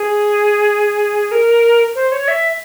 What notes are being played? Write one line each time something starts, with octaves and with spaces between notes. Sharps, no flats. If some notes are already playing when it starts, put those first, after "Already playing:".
Already playing: G#4
A#4
C5
C#5
E5